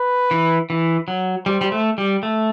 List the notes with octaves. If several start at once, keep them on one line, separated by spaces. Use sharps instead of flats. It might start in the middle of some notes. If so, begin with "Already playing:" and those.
Already playing: B4
E3
E3
F#3
G3 C5
G3
A3
G3
A3